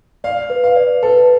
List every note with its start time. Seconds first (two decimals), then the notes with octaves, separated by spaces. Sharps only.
0.24 D5 F5
0.50 B4
0.64 F5
0.76 D5
1.03 A4 B4